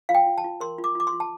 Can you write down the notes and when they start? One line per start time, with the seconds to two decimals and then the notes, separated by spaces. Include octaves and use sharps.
0.09 F4 F5
0.15 G5
0.26 F4
0.38 A5
0.44 F4
0.60 A#4 C6
0.79 F4
0.84 D6
0.95 F4 D6
1.07 C6
1.13 F4
1.20 A5